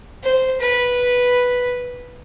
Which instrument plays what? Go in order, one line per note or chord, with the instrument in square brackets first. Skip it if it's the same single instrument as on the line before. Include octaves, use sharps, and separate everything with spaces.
[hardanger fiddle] C5
B4